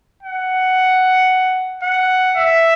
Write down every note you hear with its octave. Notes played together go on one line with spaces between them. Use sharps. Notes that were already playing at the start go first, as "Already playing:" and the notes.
F#5
F#5
E5